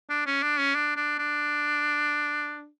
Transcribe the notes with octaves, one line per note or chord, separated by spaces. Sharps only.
D4
C#4
D4
C#4
D4
D4
D4